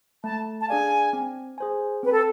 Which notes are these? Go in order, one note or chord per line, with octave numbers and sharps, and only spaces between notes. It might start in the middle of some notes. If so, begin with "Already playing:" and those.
A3 A5
A5
D4 G#4 D5 F5 G#5
C4
G#4 C5 G#5
C4 B4
A4